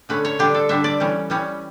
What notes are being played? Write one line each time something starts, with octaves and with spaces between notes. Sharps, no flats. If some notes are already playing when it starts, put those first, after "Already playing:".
D3 A3 C#4 B4
C#5
D3 G3 D4 G4
A4
D3 G3 D4 E5
D5
E3 G3 C#4
E3 G3 C#4